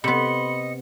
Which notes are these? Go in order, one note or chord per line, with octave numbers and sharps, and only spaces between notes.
C3 B3 D#5 B5 C6 C#7